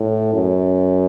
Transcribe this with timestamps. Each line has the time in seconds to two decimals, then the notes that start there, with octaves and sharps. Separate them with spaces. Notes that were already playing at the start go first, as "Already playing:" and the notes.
Already playing: A2
0.33 F#2